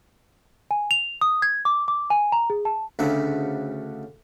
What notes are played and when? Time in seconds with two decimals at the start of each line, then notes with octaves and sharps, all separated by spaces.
0.71 G#5
0.91 F7
1.21 D#6
1.42 G#6
1.65 D6
1.88 D6
2.10 G#5
2.32 A#5
2.50 G#4
2.65 A5
2.99 D2 C#3 E5